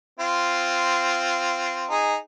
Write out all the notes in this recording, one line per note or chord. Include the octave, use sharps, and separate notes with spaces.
C4 F4
D#4 G#4